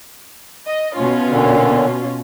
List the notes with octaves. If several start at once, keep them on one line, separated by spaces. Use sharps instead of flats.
D#5
B2 C#4 F4
A#2 D3